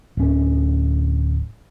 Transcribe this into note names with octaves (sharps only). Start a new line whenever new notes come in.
D1 C#4